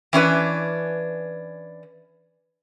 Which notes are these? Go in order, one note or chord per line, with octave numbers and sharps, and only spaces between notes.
E3 C#4 D4 B4